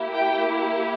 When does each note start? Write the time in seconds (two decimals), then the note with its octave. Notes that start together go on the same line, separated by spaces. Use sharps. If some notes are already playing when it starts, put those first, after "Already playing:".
Already playing: A#3 E4 G4
0.13 G5